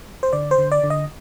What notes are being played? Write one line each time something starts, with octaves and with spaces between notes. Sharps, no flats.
C5
D3 D5
C5
D3
D5
D3
D#5